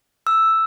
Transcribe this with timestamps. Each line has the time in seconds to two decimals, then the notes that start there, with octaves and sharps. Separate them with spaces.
0.27 E6